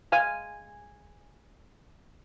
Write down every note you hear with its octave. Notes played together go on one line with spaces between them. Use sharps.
G#3 F5 G#5